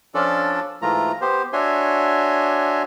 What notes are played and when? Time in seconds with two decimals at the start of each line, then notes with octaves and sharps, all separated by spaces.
0.15 F3 C#4 D4 F4 A4 D5
0.82 G#2 E3 A3 F4 A#5
1.21 B3 G4 C5
1.53 D4 F#4 C#5 E5 G#5 C6